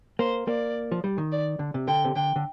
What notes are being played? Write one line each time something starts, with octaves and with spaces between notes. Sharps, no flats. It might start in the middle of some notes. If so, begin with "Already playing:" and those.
A#3 C5
A#3 D5
F3
G3
D#3
D5
D3
C3
D3 G5
C3
D3 G5
D3